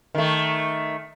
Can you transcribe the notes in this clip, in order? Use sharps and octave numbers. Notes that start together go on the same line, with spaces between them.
D#3 A3